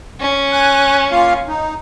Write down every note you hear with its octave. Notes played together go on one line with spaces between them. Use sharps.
C#4
G#5 F#6
A#3 F4 F5
D#4